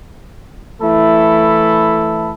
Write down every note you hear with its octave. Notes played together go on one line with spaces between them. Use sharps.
E3 A3 E4 A4 B5